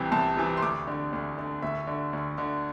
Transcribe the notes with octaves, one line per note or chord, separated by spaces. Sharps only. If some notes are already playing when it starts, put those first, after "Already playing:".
Already playing: C2 C3 E3 G5
C2 A5
C3 E3
C6
D2 D6
D3
D2
D3
D2 E5
D3
D2
D3